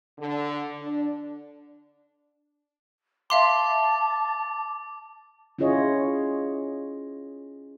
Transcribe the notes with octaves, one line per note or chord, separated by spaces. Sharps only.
D3
D4
E5 F5 A5 C6 D6
C#4 E4 F4 G#4 C#5 D#5